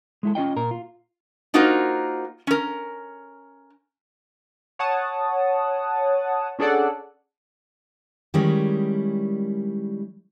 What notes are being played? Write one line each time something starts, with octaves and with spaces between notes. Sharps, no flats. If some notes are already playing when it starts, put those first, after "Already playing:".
G#3 E4 A4
C#4 F4 D#5 G5
A#2 A#4
F4
A#3 D#4 F4 F#4 A#4 C5
C#4 A#4
C#5 F#5 A5 D#6
C#4 D4 G#4 A4 D5 F#5
D#3 G3 G#3 C#4 E4 D5